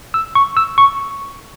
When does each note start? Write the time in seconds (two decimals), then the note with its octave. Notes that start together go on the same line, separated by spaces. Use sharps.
0.14 E6
0.35 C#6
0.57 E6
0.78 C#6